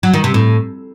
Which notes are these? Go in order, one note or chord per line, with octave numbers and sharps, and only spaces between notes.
F#3
D#3
C3
A2